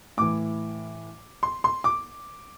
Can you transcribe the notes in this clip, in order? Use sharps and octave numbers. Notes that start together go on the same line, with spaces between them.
A2 E3 D6
C6
C6
D6